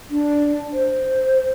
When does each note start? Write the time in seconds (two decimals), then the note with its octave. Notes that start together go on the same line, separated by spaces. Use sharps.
0.10 D4
0.73 C5